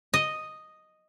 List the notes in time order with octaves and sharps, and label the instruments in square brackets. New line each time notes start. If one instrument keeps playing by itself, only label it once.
[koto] D#5